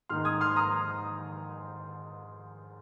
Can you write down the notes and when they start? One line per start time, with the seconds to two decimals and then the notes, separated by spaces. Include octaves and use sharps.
0.09 G#2 D#3 A#3 D#4 C6 F6
0.25 D#6 G#6
0.41 C6 F6
0.56 A#5 D#6